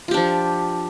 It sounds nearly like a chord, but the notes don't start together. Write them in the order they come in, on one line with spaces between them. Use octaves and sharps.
F4 G4 D4 F3